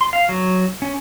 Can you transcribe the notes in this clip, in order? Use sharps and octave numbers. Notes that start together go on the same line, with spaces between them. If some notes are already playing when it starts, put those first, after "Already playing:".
C6
F5
F#3
C#4